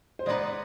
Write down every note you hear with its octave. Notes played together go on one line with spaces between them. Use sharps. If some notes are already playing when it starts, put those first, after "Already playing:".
C5
G#3 B3 D#4 B4 D5